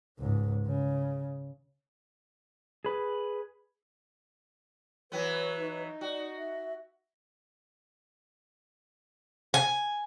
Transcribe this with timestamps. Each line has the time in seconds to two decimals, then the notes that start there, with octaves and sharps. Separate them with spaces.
0.19 C#2 G#2
0.67 C#3
2.85 G#4 B4
5.12 E3 F#3 B3 B4
5.59 D#4
6.01 F#4 D5
6.37 E5
9.54 G#5